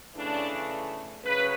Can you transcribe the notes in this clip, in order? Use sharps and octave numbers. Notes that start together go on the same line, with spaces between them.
C#3 E3 A3 D4
C#3 F#3 B4